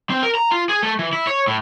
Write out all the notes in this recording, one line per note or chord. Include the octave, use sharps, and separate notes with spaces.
C4
A#4
A#5
F4
G#4
A3
E3
E4
C#5
A2